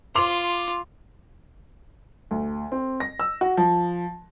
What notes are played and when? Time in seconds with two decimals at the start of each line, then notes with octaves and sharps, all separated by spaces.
0.15 F4 C6 D6 F7
2.31 D2
2.72 C4
3.00 A#6
3.20 E6
3.41 F#4
3.57 F3